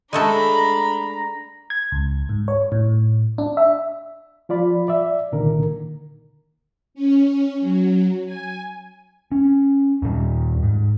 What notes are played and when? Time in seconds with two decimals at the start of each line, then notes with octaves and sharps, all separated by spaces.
0.13 G#3 A3 D4 A4 A#5 B5
1.70 G#6
1.92 C#2
2.29 G#2
2.48 C#5
2.72 A2
3.38 D4
3.57 E5
4.49 F3 F4 D5 B5
4.88 D5 E5
5.32 C2 A#2 D3 D#3 A#4
6.94 C#4
7.61 F#3
8.25 G#5
9.32 C#4
10.02 D#2 A#2 G3
10.63 G#2